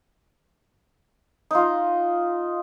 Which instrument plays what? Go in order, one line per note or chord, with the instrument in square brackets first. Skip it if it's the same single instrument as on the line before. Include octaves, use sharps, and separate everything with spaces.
[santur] D#4 F4